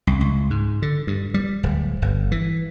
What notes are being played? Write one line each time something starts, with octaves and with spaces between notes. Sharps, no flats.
C2
C#2
G#2
D3
G2
G3
D1
G1
E3